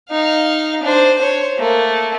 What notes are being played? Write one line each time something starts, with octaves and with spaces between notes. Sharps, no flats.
D#4 F5
D4 C5
C5 C#5
A3 A#3